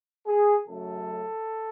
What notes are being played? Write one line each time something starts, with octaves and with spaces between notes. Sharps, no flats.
G#4
F#2 C#3 F#3 A3 A4